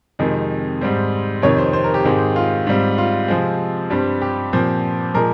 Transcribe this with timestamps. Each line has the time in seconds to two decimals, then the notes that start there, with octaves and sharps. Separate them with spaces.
0.19 F2 C3 D#3 G#3
0.81 G#2 G3 C4
1.42 F2 C3 D#3 C#5
1.58 C5
1.73 C5
1.84 A#4
1.94 G4
2.04 G#2 D#3 G#3 C4
2.36 F4
2.67 G#2 G3 C4
2.98 F4
3.28 C3 F3 G#3 C4
3.90 G2 G3 C4
4.22 G4
4.53 A#2 F3 C4
5.14 A#2 F3 G#3 A#4